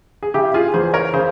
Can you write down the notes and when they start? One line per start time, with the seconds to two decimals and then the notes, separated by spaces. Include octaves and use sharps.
0.23 G#4
0.34 C#3 E4 G4
0.54 F4 G#4
0.74 E2 G#4 C5
0.94 A#4 C#5
1.14 C#3 G#4 C5